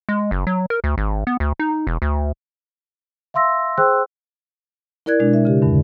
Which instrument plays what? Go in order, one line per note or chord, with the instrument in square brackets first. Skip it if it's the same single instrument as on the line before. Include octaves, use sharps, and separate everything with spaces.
[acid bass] G#3
F#1
F#3
A#4
D2
G#1
B3
D2
D#4
E1
D2
[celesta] E5 F5 C6 E6 A#6
G#4 C5 G5 C6 E6 F#6
[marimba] E4 A#4 D5 F#6 G#6
B2 G#3 D4
E5
C#3 G4
E2 G2 D3